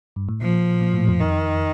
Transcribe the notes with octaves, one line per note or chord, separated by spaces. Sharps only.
G2
A2
A#2 F3
A#2
A2
F2
D#3